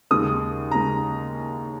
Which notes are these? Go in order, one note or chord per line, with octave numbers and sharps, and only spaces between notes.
D#2 C#3 G#3 D#6
C#3 G#3 A#5